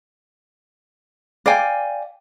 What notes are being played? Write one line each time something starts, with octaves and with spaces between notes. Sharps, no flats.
D5 F5 G5 G#5